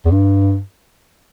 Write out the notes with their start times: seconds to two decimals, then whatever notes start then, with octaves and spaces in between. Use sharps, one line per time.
0.06 E2
0.12 G2